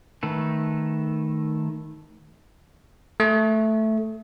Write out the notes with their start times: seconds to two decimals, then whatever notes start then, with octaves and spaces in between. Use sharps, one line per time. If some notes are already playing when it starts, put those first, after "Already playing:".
0.23 D#3 A3 A4 B4
3.20 A3